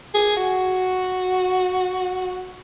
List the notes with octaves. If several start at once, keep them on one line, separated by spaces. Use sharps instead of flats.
G#4
F#4